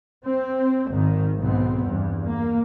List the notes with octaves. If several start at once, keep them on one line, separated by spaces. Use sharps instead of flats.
C4
G#1 D#3
B1 G#2 B3 C4
E2 G2
A#3